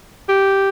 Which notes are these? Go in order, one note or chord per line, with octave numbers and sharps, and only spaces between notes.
G4